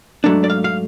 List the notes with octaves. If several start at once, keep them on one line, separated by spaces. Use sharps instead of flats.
G#2 F#3 A3 D4
D5
F5
F5